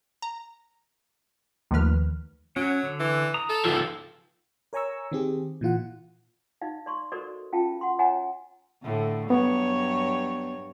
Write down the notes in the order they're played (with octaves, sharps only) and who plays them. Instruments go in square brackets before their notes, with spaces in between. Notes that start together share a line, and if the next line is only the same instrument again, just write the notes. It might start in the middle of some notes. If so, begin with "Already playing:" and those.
[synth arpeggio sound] A#5
D#2 D#3 F3 A3 B4 F6
[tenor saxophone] F#3 [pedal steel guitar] C#4
[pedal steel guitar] D3
[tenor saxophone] E3
[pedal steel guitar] A#5 D#6
[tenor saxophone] A4
[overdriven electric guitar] C#2 F3 [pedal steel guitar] D3 E6
[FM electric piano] A#4 C#5 G#5 A#5 C#6 E6
D#3 C4 G4 G#4
A#2 E3 F4 F#5
[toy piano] D#4 D#5 F5
D5 C6 C#6
F#4 A4 A#4 C5 D5 D#5
C#4 F4 F5 G5 A5
F#5 C6
C#5 D#5 F#5 G#5 A#5
[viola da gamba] A2 D3
[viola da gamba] G2 F#3 C#5 [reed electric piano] B3